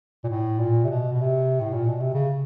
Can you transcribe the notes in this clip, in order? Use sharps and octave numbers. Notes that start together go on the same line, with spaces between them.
A#2
A2
A#2
C3
B2
B2
C3
A2
A#2
B2
C3
C#3